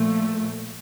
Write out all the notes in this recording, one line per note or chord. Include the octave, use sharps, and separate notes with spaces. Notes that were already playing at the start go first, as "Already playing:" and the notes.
Already playing: A#2 F3 A3